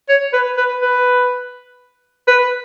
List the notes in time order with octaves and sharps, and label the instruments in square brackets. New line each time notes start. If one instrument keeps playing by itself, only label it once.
[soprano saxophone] C#5
B4
B4
B4
B4